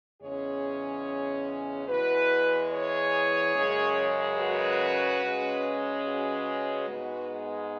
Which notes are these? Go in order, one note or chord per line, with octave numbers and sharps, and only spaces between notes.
E2 C#3 G#3 C#4 G#4 C#5
E2 E3 G#3 F#4 B4
G#4 C#5
F#2 C#3 G#3 C#4
F#4 B4
C#3 G#3 C#4
F#4 B4
G#2 G#3 B3